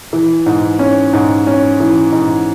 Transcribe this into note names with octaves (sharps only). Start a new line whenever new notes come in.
E3
G#2
C#4
G#2
C#4
E3
G#2